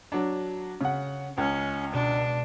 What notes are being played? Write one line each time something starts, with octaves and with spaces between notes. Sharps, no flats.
F#3 D4
C#3 F#5
C#2 C#4
B2 G#3 D4